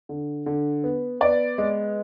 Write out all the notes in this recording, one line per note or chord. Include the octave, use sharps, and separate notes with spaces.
D3
D3
B3
B3 D5
G#3